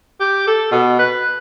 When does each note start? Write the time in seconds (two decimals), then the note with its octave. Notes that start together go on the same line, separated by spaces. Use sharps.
0.20 G4
0.47 A4
0.71 B2
0.99 B4